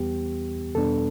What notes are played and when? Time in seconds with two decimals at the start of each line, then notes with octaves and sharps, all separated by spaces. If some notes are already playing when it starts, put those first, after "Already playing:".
Already playing: E2 E3 G3 B3 G4
0.75 E2 B2 G3 B3 D4 A4